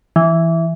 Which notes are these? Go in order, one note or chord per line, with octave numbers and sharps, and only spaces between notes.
E3